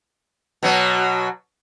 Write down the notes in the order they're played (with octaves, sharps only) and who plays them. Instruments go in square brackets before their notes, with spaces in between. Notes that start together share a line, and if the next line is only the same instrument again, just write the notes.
[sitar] B2 F#3